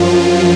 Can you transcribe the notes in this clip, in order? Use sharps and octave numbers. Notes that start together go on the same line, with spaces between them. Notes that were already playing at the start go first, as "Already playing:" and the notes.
Already playing: F#2 F3 F4